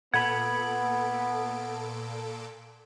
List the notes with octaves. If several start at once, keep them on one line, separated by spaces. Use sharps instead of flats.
A#2 B3 A4 F#5 B5 G#6 D7